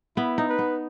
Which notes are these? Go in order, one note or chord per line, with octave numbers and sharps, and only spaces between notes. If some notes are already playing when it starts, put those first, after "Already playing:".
B3 E4
D#4
B4
B3